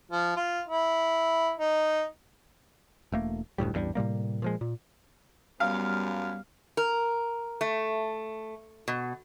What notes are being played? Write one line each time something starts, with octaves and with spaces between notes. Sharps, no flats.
F3
F4
E4
D#4
E1 A3 A#3
F#1 D2 A2 G3
A1 E2 G2 G3
A2 C3 G3 A#3
A#2 F3 G#3
A#2
F#2 G3 B3 F5
A#4
A3
B2